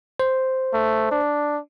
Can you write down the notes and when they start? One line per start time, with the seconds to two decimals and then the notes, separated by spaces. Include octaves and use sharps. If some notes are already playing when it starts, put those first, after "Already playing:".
0.20 C5
0.74 A3
1.11 D4